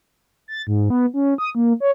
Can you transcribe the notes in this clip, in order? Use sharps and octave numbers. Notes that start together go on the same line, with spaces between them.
A6
G#2
B3
C#4
D#6
A#3
C#5